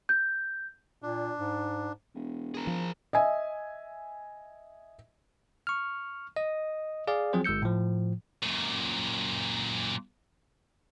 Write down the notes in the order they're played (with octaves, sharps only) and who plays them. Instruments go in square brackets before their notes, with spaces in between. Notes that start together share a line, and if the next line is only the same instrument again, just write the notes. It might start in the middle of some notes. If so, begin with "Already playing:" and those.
[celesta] G6
[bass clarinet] A#2 [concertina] D4
[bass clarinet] G#2
[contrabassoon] E1
[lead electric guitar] G#4 A#4
[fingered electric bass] F3
[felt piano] D#5 E5 G#5
[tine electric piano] C#6 F6
D#5 D#6
G#4 D5 F5
F3 F#3 C4 G#4 C5
G1 G#3 E6 G6 C#7
A2 F3
[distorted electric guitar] F#2 A#2